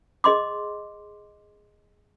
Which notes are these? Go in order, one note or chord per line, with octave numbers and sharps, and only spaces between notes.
G#4 D#5 C6 D6